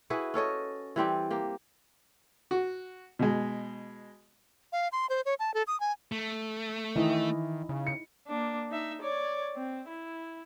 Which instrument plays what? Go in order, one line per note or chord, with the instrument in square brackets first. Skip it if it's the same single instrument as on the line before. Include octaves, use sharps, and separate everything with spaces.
[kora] E4 F#4 G#4 B4
C#4 A4 C#5 D#5
E3 G3 C4 G4
A#3 G4
[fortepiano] F#4
B2 G#3
[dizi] F5
C6
C5
C#5
A5
A4
D#6
G#5
[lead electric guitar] A3
[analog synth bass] D#3 [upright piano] E3 [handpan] D#4 E4 D#5
[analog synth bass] C#3
[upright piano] C#7
[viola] A#3 D4
D#4 E5
C#5 D5
C4
E4